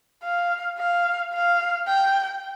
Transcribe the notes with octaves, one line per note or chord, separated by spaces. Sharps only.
F5
F5
F5
G5